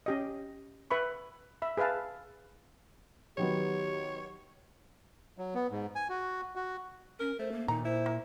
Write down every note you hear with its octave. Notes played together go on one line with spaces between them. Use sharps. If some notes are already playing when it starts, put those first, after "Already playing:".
C#4 G4 D#5
B4 E5 B5 C#6
E5 B5
G#4 B4 E5 F5 A5
D#3 F#3 B3 G4 C#5
F#3
B3
G#2
G#5
F#4
F#4
C#4 A#4
A3 C5
A#3
A#2 D#3 D#4 A#5
E4 C5
A#3